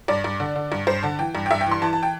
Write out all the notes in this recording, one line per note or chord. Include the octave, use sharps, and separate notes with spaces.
G2 D5
G2
D3
D3
G2
G2 C5
D3 A5
E3 G5
G2
G5
G2 E5
G5
E3
C6
E3 A5
A5
G5